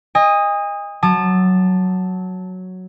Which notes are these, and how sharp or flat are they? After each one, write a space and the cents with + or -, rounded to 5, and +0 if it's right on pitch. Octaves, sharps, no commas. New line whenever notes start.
D#5 +0 G#5 -40
F#3 +0 A5 +0 D#6 -45